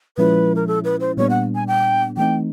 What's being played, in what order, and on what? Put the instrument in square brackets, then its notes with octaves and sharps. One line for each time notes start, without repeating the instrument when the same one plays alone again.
[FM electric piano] A#2 F3 G#3 C#4 E4 [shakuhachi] B4
[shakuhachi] A#4
A4
B4
C5
[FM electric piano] A#2 G3 B3 D4 [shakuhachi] C#5
[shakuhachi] F#5
G#5
G5
[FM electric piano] E3 A3 C4 D#4 [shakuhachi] G5